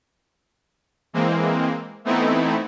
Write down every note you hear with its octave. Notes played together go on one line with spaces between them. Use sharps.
E3 G#3 A#3 C4
E3 A3 B3 C4 D#4 E4